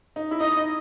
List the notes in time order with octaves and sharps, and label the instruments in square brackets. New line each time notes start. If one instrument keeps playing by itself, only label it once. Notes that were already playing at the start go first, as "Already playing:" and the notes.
[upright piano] D#4
E4
[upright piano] D#4 [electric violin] D#5
[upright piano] D#4